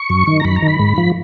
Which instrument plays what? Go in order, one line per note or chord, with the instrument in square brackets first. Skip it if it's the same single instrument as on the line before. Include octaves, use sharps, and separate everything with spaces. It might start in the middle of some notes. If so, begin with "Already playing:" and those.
Already playing: [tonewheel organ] C#6
F#2
D#3
A#5
F#2 B5
A#5
D#3
B5
G#2
F3